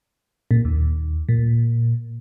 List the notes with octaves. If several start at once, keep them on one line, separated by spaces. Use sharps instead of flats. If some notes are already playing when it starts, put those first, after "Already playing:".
A#2
D#2
A#2